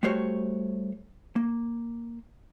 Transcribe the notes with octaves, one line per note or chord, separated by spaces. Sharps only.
G3 A3 F#4 C5 C#5
A#3